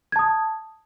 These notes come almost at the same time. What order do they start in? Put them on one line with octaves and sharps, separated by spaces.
G#6 A5 D#6